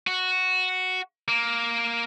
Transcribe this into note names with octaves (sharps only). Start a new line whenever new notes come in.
F#4
A#3